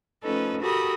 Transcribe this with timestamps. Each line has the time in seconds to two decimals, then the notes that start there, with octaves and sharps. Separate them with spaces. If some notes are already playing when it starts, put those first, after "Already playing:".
0.23 F3 A3 C#4 D#4 A4 B4
0.62 F#4 G4 A4 A#4 B5 D#6